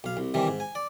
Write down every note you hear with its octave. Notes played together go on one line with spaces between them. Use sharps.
B1 F5
C2
C3 D#3 E3 G3
G#2
G#5
D5